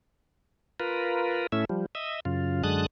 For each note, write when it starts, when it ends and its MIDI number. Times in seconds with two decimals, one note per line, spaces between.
0.80 1.47 65
0.80 1.47 70
0.80 1.47 71
1.52 1.65 45
1.52 1.65 57
1.52 1.65 61
1.52 1.65 64
1.52 1.65 76
1.69 1.86 53
1.69 1.86 55
1.95 2.20 75
1.95 2.20 76
2.25 2.63 42
2.25 2.63 49
2.25 2.63 65
2.64 2.86 42
2.64 2.86 50
2.64 2.86 56
2.64 2.86 81
2.64 2.86 87
2.64 2.86 90